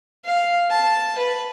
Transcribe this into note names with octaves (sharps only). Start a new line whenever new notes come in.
F5
A5
B4